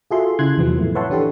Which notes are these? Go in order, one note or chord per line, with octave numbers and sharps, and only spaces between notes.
F4 F#4 G#4 A4 E5 C6
C#3 E4 C6 F#6 G#6
E2 C3 F3 F#3 B3
A2 A3
B4 C#5 E5 F#5 A5 C6
E3 D4 G4 A4